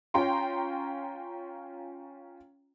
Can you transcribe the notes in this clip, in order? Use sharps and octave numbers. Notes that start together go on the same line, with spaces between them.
C#4 F4 G5 A#5 C6